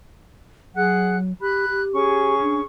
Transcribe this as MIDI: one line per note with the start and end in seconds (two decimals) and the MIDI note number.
0.74 1.33 54
0.74 1.15 68
0.74 1.15 78
0.74 1.15 90
1.41 1.66 67
1.41 1.80 83
1.41 1.80 90
1.69 2.35 67
1.93 2.61 61
1.93 2.61 68
1.93 2.61 85
2.41 2.60 62